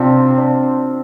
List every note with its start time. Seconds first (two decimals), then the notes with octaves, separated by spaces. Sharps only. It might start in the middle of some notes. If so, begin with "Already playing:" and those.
Already playing: C3 C4 D4 F4
0.37 D4